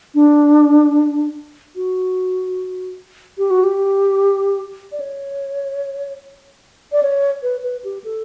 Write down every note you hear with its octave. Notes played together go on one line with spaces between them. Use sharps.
D4
F#4
G4
F#4
G4
D5
C#5
D5
C#5
B4
B4
G4
A4